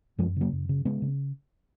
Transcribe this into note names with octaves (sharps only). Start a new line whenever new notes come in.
F#2 F3 G#3
C#3 F#3 A#3
F#2
C#3
C#3 G#3 B3
C#3